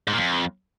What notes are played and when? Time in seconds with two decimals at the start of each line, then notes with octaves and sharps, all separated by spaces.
0.07 G#2
0.13 A#2
0.18 F2